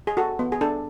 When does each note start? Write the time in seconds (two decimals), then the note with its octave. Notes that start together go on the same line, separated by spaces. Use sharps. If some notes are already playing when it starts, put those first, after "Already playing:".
0.07 G#4
0.17 F#4 A4
0.39 B3
0.52 G#4
0.61 D4 A4